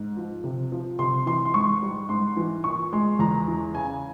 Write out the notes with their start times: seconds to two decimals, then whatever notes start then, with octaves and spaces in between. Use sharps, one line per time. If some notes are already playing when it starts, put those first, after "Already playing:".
Already playing: G#2
0.17 F3
0.44 C3
0.72 F3
0.99 C3 C6
1.26 E3 C6
1.45 C6
1.54 G#2 C#6
1.82 G3
2.09 G#2 C6
2.37 E3
2.64 A#2 C#6
2.93 G#3 C6
3.19 E2 A#5
3.48 E3
3.74 C#3 G#5